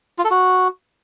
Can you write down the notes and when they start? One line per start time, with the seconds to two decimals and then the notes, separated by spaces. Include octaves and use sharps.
0.18 F4
0.25 A4
0.31 F#4